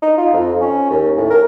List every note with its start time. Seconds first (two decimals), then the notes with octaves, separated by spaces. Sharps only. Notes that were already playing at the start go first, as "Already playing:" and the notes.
0.02 D#4
0.18 F4
0.34 F2
0.61 C#4
0.90 D#2
1.18 A2
1.30 A#4